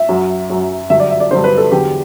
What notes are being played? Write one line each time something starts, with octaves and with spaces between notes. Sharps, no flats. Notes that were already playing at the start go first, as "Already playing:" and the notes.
Already playing: E5
F#2 F#3
F#2 F#3
G2 D3 F#3 E5
D5
E5
D5
G2 D3 F#3 C5
B4
A4
E2 D3 F#3 G4